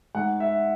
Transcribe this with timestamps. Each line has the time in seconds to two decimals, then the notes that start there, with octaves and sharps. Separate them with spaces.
0.15 G#2 F#5
0.40 E5